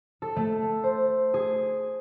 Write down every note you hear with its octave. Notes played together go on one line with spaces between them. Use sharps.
A4
A3
C5
G#4